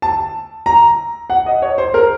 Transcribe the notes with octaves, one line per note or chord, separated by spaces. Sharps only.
A5
A#5
F#5
D#5
C#5
C5
A#4